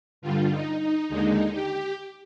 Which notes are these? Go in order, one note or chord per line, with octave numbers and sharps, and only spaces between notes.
G2 D3 G3 F4
D#4
D#4
D#2 D3 G#3 D#4
G4